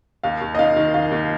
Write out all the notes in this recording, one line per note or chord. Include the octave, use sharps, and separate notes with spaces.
D#2 F5
D#2
D#5
D#3 F5
D#3
D#2 F5
D#2